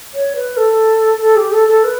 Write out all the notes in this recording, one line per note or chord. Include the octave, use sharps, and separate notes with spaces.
C#5
B4
A4
A4
G4
A4
A4
B4